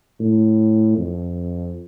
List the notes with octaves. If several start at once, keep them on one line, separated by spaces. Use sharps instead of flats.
A2
F2